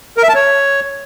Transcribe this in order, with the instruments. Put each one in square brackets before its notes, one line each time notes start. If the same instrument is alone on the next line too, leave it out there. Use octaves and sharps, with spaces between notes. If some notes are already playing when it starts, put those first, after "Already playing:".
[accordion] A#4
E5
A5
C#5